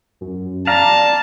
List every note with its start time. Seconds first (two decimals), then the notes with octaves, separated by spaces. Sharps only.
0.21 F#2
0.67 D5 F5 A5 A#5